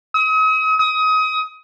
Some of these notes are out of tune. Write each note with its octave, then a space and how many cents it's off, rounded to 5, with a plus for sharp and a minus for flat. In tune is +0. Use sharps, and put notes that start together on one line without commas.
D#6 +40
D#6 +25